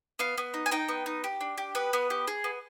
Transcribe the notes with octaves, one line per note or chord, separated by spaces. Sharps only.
B3 F5
B3
D#4
G#5
D#4 G5
B3
D#4
G4
D4
G4
B3 B4
B3
G4
G#4
B3